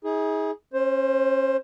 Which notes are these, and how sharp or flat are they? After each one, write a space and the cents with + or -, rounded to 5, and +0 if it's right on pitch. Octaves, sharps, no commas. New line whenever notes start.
D#4 +45 G#4 +0
C#4 -30 C5 +15